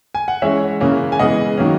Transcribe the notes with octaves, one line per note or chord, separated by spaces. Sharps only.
G#5
F#5
E3 G#3 C#4 C#5 E5
C#3 E3 A#3 C#4
G#5
C#3 E3 G#3 B3 D#5 F#5
D#3 F#3 A#3 C#4